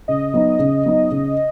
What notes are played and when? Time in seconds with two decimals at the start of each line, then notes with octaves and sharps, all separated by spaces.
0.08 C#3 D#5
0.34 F#3 B3 D#4
0.59 C#3
0.86 F#3 B3 D#4
1.11 C#3